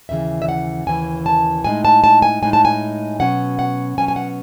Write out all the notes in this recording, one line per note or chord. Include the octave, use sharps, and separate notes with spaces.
D#2 C#3 E3 E5
E5
F#5
D#2 C#3 E3 G#5
A5
A2 G#3 D#4 G#5
A5
A5
G#5
A2 G#3 D#4 G#5
A5
G#5
B2 F#3 C#4 F#5
F#5
B2 F#3 C#4 G#5
G#5
F#5